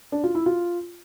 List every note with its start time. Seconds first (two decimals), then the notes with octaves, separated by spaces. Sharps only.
0.12 D4
0.24 F4
0.35 E4
0.46 F4